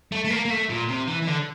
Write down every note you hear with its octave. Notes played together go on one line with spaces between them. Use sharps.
A3
A3
A#3
A#3
A3
A#2
C3
E3
E3
D3